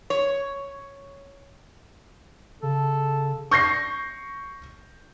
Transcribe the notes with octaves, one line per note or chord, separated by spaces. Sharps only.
C#5
C#3 A4
C#6 G6 A#6 C7